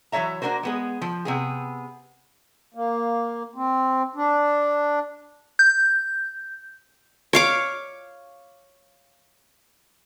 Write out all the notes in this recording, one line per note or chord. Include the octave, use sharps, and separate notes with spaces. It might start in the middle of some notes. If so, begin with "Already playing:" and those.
E3 F#3 D#4 C#5 E5 A#5
A#3 D4 F#4 A#4 C5
G#3 B3 G#4
F3
C3 B3 G#4
A#3
C4
D4
G6
C#5 F5 D6